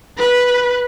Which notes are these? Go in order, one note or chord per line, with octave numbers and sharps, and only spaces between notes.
B4